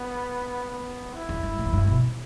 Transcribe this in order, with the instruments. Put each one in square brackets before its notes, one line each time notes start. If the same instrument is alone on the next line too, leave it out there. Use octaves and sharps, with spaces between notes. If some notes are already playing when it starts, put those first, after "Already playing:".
Already playing: [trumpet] B3
B3
E4
[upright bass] E2
G2
A2
E2
G2
B2